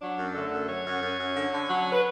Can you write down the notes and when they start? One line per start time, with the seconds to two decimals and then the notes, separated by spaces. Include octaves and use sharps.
0.02 F#3 D4
0.18 F#2
0.35 D3 A3 A4
0.52 F#2
0.69 F#3 C#4 C#5
0.86 F#2
1.02 F#2
1.19 F#2
1.35 D3
1.52 D3
1.69 F#3
1.93 B4